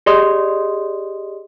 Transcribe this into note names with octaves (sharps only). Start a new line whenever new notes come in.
G4 G#4 D5 D#5 C6 D#6